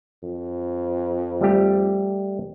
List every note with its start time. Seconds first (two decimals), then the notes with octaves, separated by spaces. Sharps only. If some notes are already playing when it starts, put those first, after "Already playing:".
0.23 F2
1.41 G3 A3 G4